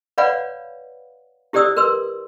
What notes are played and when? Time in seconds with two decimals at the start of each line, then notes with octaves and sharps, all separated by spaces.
0.18 B4 C#5 D5 F5 F#5 B5
1.53 E4 G4 C5 D5 D#6 E6
1.77 A#4 B4 C6 E6